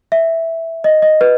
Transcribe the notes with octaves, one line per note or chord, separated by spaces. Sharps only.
E5
D#5
D#5
B4